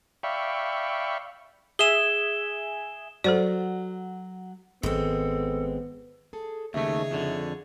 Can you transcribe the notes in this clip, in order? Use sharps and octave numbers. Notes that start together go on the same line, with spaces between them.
D5 E5 F5 G5 B5 C#6
G#4 E5 G#5 E7 G7
F#3 F#4 A4 C5 D5
G#1 G#3 B3 C4 A4
G#4 A4
D#2 C#3 G3 A3 D#4 G#4 C#5 E5
F2 D3